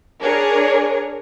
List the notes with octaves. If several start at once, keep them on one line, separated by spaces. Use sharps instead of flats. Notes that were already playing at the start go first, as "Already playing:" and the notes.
D4 G#4 A#4 C#5